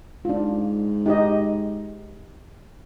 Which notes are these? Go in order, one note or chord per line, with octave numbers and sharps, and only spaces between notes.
G#2 D4 F4
D#4 G4 D#5